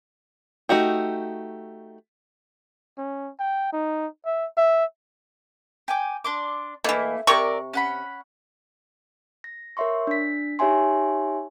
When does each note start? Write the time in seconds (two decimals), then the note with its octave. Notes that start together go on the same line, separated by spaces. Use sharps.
0.69 A3 D#4 F#4 G4
2.98 C#4
3.39 G5
3.73 D#4
4.25 E5
4.57 E5
5.88 G5 G#5 D6
6.24 D4 C6 D6
6.84 B2 E3 A3 A#3 E4
7.27 C3 A#4 D5 C#6 E6
7.73 C#4 F#5 B5
9.44 A#6
9.77 A#4 C#5 E5 C6 C#6
10.07 D4 B6
10.59 D#4 G4 C#5 E5 G#5 C6